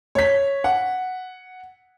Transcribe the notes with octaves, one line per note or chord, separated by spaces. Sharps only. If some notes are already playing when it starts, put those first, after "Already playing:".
C#5 B6
F#5